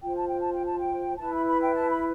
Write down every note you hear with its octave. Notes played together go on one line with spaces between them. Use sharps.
F4 C5 G5
A5
G5
A5
G5
A5
G5
E4 B4 A5
B5
B5
G5
A5
B5